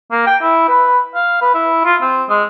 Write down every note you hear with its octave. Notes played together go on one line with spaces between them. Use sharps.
A#3
G5
E4
B4
F5
B4
E4
F4
C4
G#3